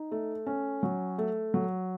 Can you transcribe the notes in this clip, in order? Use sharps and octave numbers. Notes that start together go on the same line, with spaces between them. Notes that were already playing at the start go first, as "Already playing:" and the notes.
Already playing: D#4
A3
C#4
F#3
A3
F#3